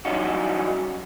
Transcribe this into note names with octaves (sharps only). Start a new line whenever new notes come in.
E3 F#3 G3 C#4 D#4 F#4